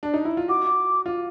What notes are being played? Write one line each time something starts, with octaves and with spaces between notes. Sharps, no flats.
D4
D#4
E4
F4
F#4 D6
F4